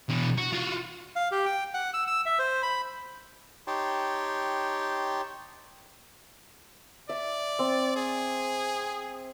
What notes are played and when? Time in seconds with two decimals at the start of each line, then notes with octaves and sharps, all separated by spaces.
0.09 B2 E3
0.38 F#4
0.53 F4 F#4
1.16 F5
1.32 G4
1.46 G5
1.74 F#5
1.94 E6
2.07 E6
2.26 E5
2.39 C5
2.63 B5
3.67 D#4 G4 C#5 G5 A5 C6
7.09 D5 E5
7.59 C4
7.96 G#4